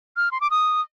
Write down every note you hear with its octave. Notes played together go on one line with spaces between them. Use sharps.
F6
C6
D6
D#6